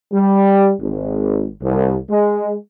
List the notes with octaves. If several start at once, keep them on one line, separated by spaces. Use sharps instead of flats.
G3
G#1
C2
G#3